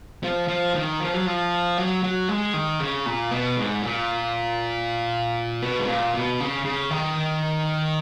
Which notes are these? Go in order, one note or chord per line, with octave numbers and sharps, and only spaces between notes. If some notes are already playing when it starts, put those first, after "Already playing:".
F3
F3
D#3
F3
F#3
F3
F#3
F#3
G#3
D#3
C#3
A#2
B2
G#2
A#2
B2
G#2
A#2
B2
C#3
C#3
D#3